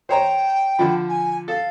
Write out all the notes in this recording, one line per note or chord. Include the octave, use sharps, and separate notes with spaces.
C5 C#5 G5 A#5
D3 F3 B5
G#5
A4 F5